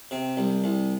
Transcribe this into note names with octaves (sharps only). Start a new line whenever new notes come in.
C3
C2
C2